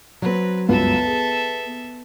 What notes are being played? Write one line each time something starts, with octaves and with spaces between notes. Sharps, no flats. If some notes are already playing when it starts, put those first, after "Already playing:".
F#3 C4 B4
G1 C#2 F#2 B3 A4 E5
G#4